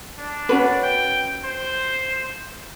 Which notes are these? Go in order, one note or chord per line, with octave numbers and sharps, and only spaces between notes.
D4
C#4 F#4 B4
G5
C5